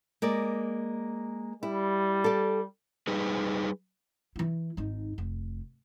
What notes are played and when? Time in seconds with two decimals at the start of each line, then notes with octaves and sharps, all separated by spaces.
0.22 G#3 A#3 D5
1.63 G3 E4
2.24 A4 D5
3.07 G3 D#4 G#4 B4
4.36 E3 E4
4.77 G#1 D#4
5.18 F1